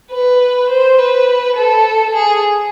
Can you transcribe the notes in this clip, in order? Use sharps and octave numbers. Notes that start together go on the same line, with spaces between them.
B4
C5
B4
A4
G#4